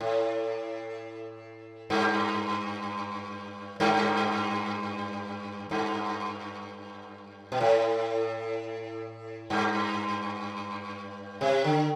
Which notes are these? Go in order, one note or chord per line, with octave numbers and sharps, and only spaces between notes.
A2
G2
G2
G2
B2
A2
G2
C3
D3